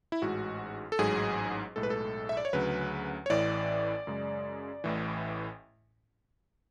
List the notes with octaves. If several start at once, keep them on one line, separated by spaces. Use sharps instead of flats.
E4
A1 G#2 G#3 F#4
A4
A1 G#2 F#3 G#4
B1 A2 G#3 A4
B4
A4
E5
D5
C#5
D2 C#3 F#3 B4
C#5
A1 A2 E3 D5
F#2 C#3 G#3
A1 A2 E3